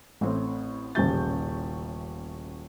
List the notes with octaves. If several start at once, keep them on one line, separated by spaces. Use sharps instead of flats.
A1 A2 C4
D#1 A1 C#3 G4 G6 A6